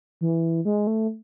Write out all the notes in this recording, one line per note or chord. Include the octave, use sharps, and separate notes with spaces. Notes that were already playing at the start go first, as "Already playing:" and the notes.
E3
G#3
A3